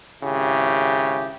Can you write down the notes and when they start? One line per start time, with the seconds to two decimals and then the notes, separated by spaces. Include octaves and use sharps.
0.23 G#1 C#3 E4 G4